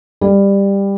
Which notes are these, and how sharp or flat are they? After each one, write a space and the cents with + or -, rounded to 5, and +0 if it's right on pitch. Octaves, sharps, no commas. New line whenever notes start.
G3 +15